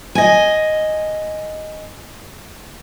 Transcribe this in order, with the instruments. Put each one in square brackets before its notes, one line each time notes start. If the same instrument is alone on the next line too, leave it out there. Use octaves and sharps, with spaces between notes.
[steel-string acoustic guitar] D#5 G#5